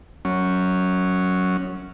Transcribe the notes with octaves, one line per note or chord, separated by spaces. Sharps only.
F#3 C#4